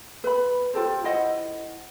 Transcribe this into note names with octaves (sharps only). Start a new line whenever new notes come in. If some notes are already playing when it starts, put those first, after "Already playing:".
B4 B5
F4 G4 A4 C5
E4 C5 D#5 F#5